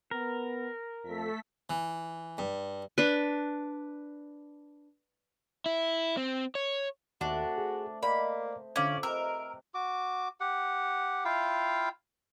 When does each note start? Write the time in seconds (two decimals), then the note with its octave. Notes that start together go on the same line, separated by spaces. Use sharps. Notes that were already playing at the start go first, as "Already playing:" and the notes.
0.11 B3 A#4
1.04 F2 A3 A4 B6
1.70 E3
2.38 G2
2.98 D4 B4
5.66 E4
6.17 C4
6.55 C#5
7.21 D#2 A3 C4 D4 F#4
7.58 G#4
8.03 A#3 C5 D5 D#5 B5
8.76 F2 D3 C#4 D5 F5 G#6
9.03 C3 A#4 B4 D#5 E6
9.74 F#4 D6
10.40 G4 F#5
11.25 E4 F4 F5 G5